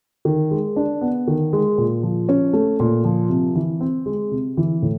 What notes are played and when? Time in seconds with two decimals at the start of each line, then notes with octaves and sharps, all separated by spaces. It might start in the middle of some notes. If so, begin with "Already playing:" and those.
0.25 D#3
0.51 G#3
0.76 D4
1.01 B3
1.27 D#3
1.53 G#3
1.78 A#2
2.03 F3
2.29 C#4
2.53 A3
2.80 A#2
3.04 F3
3.30 C3
3.55 E3
3.81 C4
4.06 G#3
4.31 C3
4.57 E3
4.82 A2